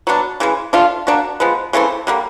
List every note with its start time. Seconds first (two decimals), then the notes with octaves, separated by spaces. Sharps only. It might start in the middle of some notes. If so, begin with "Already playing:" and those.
0.07 F#3 B3 D4
0.40 C#3 E3 G#3
0.73 A3 D4 F4
1.07 A#3 D4 F#4
1.40 F3 G#3 B3
1.73 C#3 E3 A3 C4
2.07 D3 G3 A#3